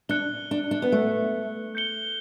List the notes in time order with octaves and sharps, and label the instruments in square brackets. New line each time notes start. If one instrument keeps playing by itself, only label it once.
[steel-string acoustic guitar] D4 [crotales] F#6 C#7 G7
[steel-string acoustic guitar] D4
D4
B3
A3
[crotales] G6 C#7 G7